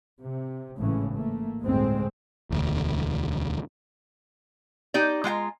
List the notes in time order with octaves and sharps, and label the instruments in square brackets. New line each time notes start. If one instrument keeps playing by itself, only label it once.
[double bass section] C3
G#1 A2 C#3 E3 C#4
A3 A#3
G1 D2 A2 G#3 C4
[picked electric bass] E1 D2
[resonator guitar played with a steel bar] D#4 G4 D5
G#3 F4 F#5 A#5